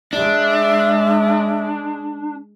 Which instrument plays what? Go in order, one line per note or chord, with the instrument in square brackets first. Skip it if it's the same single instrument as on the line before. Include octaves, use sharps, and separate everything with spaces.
[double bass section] G#3 [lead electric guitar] D4 [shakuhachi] E5